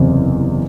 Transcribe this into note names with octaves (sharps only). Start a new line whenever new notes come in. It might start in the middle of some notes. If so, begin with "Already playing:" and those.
Already playing: F#1 E2 C3